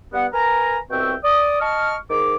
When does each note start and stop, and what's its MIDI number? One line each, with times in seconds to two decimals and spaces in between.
0.13 0.26 43
0.13 0.26 59
0.13 0.26 78
0.32 0.78 70
0.32 0.78 71
0.32 0.78 80
0.32 0.78 82
0.90 1.14 36
0.90 1.14 47
0.90 1.14 60
0.90 1.14 76
0.90 1.14 79
0.90 1.14 85
1.23 1.60 74
1.23 1.60 87
1.61 1.95 75
1.61 1.95 81
1.61 1.95 85
1.61 1.95 89
2.09 2.36 44
2.09 2.36 51
2.09 2.36 68
2.09 2.36 86